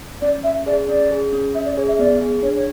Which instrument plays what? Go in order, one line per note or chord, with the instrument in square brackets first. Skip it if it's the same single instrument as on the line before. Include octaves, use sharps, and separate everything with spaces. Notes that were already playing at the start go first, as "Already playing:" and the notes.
[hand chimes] C#4 [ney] D5
[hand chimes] C#4 [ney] E5
[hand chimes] G#4 [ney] D5
[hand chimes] C#4 [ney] D5
[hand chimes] G#4
C#4
[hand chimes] C#4 [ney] E5
[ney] D5
[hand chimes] G#4 [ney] C#5
[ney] E5
[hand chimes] B3 [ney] D5
[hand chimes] G#4
[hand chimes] D4 [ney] C#5
[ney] C#5